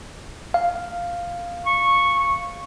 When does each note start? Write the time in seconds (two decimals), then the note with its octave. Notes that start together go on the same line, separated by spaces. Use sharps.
0.54 F5
1.66 C#6